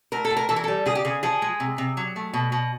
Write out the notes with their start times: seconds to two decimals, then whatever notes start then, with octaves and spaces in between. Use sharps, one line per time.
0.12 A2 A#4
0.25 A4
0.30 A2
0.36 A#4
0.49 E3 A4
0.56 A#4
0.64 G3 A4
0.86 C#3 G#4
0.95 G4
1.05 C#3 G#4
1.23 F3 G#4
1.42 G#3
1.60 C3
1.78 C3
1.97 F#3
2.16 A3
2.34 B2
2.52 B2